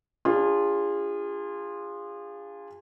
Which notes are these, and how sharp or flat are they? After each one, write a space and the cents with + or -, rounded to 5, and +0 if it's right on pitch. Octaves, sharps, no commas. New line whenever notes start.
D4 +0 F4 +0 G#4 -30